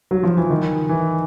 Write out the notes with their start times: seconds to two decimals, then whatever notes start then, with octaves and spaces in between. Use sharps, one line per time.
0.11 F#3
0.23 F3
0.37 E3
0.50 D#3
0.89 E3